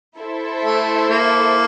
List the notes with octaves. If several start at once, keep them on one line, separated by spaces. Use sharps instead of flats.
E4 A4 C5 E5
A3
A#3